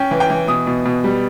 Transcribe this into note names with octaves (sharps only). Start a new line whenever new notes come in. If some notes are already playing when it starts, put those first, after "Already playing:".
Already playing: C#4 G5
E3
G5
E3
B2 D#6
B2
B2
G3